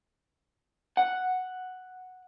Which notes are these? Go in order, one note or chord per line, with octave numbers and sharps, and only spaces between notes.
F#5